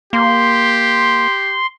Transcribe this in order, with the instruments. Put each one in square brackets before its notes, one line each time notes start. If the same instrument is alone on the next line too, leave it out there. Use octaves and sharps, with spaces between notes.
[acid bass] A#3 [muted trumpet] G4 [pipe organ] C6